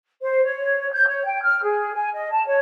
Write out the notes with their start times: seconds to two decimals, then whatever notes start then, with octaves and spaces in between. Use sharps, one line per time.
0.22 C5
0.44 C#5
0.92 G6
1.07 C#5
1.25 G5
1.42 F6
1.63 G#4
1.94 G#5
2.13 D#5
2.31 A5
2.45 C#5